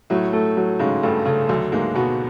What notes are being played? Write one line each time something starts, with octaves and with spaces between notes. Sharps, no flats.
A2 F#3 A3
A3
F#3
G#2 C#3 G#3
G2 G3 A3
C#3 A3
D2 D3 F#3
G#2 G#3 A#3
B2 B3 F#4